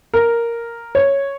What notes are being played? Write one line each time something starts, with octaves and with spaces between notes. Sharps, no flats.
A#4
C#5